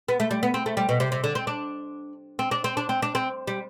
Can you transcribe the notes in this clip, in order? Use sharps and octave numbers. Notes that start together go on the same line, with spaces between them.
B3
A3
G3
B3
C4
A3
G3
B2
C3
C3
D3
C4
D4
C4
D4
C4
D4
C4
D4
C4
G3